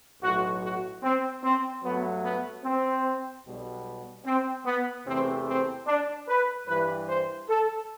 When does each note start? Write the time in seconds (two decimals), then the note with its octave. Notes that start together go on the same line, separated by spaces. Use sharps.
0.22 B1 A2 F#3 F#4
0.62 F#4
1.03 C4
1.43 C4
1.83 G2 F#3 A3 B3
2.23 B3
2.64 C4
3.45 B1 B2 G3
4.26 C4
4.66 B3
5.07 E2 C3 E3 A3 C4
5.48 C4
5.87 D4
6.29 B4
6.68 G2 E3 G3 B4
7.08 C5
7.49 A4